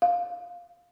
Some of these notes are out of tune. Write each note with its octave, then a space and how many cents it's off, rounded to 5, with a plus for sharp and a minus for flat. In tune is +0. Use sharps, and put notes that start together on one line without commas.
F5 +15